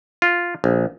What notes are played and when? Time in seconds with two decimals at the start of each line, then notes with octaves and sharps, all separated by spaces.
0.22 F4
0.64 A#1